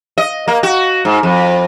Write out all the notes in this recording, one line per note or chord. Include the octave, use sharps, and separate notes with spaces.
D#5
A#3
F#4
G#2
F2